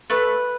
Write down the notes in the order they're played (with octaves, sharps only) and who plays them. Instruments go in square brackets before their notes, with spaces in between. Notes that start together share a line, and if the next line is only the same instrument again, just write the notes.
[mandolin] A3 B4